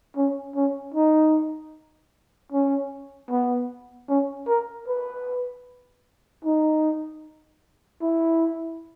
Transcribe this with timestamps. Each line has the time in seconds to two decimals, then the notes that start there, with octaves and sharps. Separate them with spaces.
0.17 C#4
0.56 C#4
0.94 D#4
2.52 C#4
3.30 B3
4.09 C#4
4.48 A#4
4.88 B4
6.45 D#4
8.02 E4